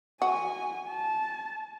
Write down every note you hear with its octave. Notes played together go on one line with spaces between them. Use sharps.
F#4 G#5
A5